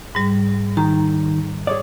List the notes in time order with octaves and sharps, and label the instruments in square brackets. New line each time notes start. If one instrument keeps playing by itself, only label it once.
[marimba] G#2 G3
[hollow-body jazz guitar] D#3 [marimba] A#5
[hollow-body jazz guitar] G#4 C#5 D5